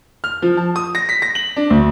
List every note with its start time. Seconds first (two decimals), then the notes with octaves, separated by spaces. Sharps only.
0.24 F6
0.42 F3
0.57 A5
0.76 D#6
0.95 A#6
1.09 B6
1.22 A#6
1.35 F#7
1.56 D4
1.70 D2